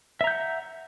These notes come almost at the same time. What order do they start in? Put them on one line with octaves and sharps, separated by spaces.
E5 A#5 G6 F#5